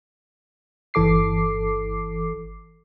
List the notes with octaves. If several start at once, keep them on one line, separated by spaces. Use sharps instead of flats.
G1 E3 A4 D6 C7